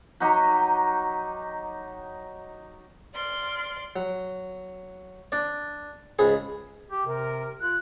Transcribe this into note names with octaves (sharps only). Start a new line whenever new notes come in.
F#3 D#4 G4
D5 C6 F6
F#3
D4 D5
C#2 G#2 G#4 B5
G4
C3 A#4
F4 F#6